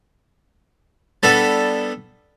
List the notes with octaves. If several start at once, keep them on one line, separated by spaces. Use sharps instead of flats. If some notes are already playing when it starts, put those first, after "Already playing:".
G3 B3 D4 A4